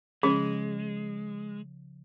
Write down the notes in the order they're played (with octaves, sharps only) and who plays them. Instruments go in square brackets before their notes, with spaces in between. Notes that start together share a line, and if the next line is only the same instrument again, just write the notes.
[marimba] C#3 F3 [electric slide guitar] G#3 [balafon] C#4 [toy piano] G#4